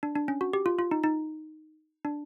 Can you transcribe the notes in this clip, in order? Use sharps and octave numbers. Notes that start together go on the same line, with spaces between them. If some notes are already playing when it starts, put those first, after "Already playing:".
D4
D4
C#4
F#4
G4
F4
F4
D#4
D#4
D4